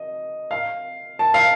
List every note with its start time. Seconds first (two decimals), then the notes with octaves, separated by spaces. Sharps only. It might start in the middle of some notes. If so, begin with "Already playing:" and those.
Already playing: D#5
0.51 F5
1.19 A5
1.34 F5